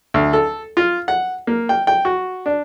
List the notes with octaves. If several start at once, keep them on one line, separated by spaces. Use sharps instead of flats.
D2
A4
F4
F#5
A#3
G5
G5
F#4
D4